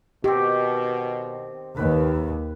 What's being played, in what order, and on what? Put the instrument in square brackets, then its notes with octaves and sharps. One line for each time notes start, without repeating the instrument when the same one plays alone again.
[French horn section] B2 [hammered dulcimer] D#3 C4 [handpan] G4
[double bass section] D#2 [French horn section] D#3 [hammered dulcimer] B4